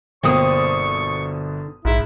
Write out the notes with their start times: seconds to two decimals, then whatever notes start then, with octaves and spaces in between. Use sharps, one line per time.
0.23 G1 B2 D3 A#3 C4 C#6 D#6
1.85 A#1 G#2 E4